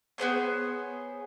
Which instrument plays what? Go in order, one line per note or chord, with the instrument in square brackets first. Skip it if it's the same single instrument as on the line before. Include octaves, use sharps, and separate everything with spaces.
[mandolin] B3 G#4 C5 C#5